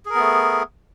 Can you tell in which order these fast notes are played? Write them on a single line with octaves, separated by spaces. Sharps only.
G#4 A#4 B3 A3